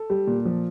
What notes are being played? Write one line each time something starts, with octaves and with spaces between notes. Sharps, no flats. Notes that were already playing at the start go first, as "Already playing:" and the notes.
Already playing: A4
G3
A#2
F3